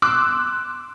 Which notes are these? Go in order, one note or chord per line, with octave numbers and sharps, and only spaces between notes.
C6 D6 E6 F#6